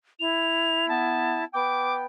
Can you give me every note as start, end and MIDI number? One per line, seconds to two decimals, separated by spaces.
0.20 1.44 64
0.20 0.89 101
0.89 1.42 59
0.89 1.43 81
1.54 2.06 59
1.54 2.06 79
1.54 1.94 86